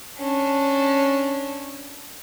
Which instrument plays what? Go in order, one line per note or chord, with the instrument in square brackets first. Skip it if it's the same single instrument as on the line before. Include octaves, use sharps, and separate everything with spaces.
[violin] C#4 D4